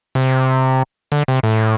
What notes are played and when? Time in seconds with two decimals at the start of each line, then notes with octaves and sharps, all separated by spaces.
0.15 C3
1.12 D3
1.28 C3
1.43 A2